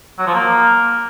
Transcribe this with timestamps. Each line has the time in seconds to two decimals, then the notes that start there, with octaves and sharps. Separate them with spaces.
0.18 F#3
0.26 F3
0.34 A#3